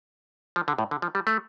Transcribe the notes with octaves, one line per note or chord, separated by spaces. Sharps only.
F3
D3
A2
D3
F3
G3
A3